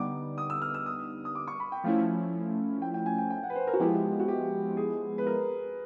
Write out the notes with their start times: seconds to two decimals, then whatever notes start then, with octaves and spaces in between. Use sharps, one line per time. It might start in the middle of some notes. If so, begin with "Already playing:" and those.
Already playing: D3 G3 B3 D#4 D6
0.38 D#6
0.50 E6
0.62 F6
0.74 E6
0.86 D#6
1.25 D#6
1.35 D6
1.48 C#6
1.60 B5
1.72 G5
1.84 F3 A3 C#4 E4 F5
2.82 G5
2.94 G5
3.06 G#5
3.18 G5
3.30 G5
3.43 F#5
3.50 B4
3.55 C5
3.67 A#4
3.74 F#4
3.79 F3 G#3 B3 E4 G4
4.19 F#4
4.28 G4
4.77 G#4
5.18 B4
5.27 A#4